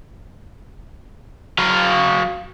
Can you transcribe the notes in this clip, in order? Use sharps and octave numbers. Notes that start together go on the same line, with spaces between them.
F#3 F5